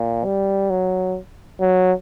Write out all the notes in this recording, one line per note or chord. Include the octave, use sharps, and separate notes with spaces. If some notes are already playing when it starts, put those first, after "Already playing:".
Already playing: A#2
G3
F#3
F#3